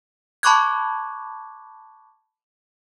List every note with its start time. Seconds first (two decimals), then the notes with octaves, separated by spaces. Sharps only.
0.43 A5 B5 C#6 D6 F#6 G#6